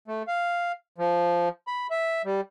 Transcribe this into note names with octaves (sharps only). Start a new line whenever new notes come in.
A3
F5
F3
B5
E5
G3